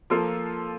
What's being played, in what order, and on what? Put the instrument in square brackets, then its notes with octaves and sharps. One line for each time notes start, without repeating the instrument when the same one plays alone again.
[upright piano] F3 A#3 F4 A4